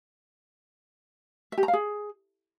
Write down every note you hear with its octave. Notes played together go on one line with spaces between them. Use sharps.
E5
G4
A#5
F5
G#4